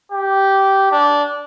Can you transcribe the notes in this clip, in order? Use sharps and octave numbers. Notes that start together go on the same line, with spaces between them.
G4
D4